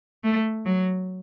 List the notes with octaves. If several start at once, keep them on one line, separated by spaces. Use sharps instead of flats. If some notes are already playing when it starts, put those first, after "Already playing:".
A3
F#3